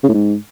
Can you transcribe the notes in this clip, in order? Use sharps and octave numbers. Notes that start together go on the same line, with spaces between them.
C#3
A2
G#2